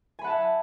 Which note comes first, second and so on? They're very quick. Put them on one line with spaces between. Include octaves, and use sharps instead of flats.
G#5 B5 F#5 A5 E5